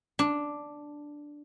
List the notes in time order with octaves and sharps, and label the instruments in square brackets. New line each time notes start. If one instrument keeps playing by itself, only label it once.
[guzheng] D4